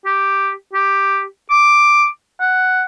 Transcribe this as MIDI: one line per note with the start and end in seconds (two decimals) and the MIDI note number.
0.06 0.51 67
0.74 1.24 67
1.50 2.07 86
2.40 2.85 78